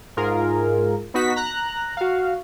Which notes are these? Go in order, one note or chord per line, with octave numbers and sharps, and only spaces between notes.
G#2 F4 G#4 A#4
B3 D#4 F#4 B6
A#5 F#6
F#4 F5